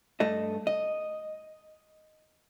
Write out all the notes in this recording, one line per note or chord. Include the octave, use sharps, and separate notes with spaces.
G2 A3 A4 D#5
D#5